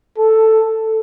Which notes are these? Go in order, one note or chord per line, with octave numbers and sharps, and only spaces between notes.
A4